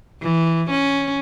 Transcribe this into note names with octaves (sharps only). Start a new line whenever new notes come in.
E3
C#4